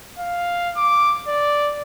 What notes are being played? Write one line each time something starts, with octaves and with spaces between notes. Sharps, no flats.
F5
D6
D5